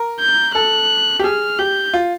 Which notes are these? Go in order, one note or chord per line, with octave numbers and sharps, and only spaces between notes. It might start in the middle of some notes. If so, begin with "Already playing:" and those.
Already playing: A#4
G6
A4 F#6
G4
G#4 F6
G4 G6
F4